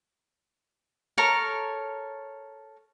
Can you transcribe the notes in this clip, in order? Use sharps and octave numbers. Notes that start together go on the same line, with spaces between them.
A4 A#4 C#5 A#5